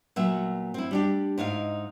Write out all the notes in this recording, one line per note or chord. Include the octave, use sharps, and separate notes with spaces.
A#2 F#3 B3 E5
C4 E4
G3 D4 G4
G#2 D#4 E4 F5